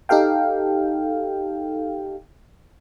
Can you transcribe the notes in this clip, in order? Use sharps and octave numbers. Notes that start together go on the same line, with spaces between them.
D#4 G4 A4 F5 G5